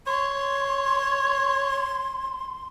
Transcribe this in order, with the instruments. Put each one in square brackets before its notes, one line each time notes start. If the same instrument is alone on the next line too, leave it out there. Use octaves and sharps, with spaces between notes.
[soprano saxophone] C#5 [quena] C6